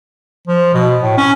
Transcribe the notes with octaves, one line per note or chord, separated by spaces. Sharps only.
F3
B2
A2
C#4